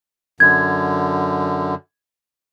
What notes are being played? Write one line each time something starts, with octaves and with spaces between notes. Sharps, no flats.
F#2 D3 G#6